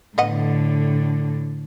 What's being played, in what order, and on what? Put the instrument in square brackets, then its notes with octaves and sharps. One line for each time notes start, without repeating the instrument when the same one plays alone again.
[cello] A2 D3 [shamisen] B3 D#5 F#5